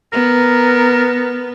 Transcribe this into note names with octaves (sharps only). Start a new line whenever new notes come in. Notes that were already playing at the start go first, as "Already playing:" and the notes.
B3 A#4